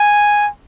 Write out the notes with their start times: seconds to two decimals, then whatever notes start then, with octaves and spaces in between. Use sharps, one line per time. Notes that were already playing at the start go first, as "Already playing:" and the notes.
Already playing: G#5